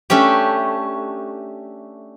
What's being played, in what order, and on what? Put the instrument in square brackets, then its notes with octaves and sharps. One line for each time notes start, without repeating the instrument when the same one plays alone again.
[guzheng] A3 C#4 D4 G4